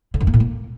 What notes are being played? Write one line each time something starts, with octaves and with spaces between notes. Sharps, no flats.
D3
F#2
A#3
A2
A#3